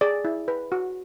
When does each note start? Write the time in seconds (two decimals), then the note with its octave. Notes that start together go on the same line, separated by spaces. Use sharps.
0.01 G#4 D5
0.25 E4
0.48 B4
0.72 F#4